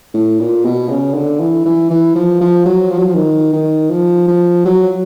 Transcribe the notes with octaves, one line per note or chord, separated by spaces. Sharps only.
A2
A#2
B2
C#3
D3
E3
E3
E3
F3
F3
F#3
F3
F#3
F3
D#3
D#3
F3
F3
F#3